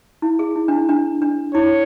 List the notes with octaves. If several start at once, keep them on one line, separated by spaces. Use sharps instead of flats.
E4
G#4
E4
D4
E4
D4
D4
E4 C#5